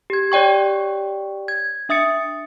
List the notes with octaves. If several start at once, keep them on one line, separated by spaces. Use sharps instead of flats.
G4 G#6
G4 C#5 D5 G5 C#6
G#6
D4 E5 D#6 A6 C#7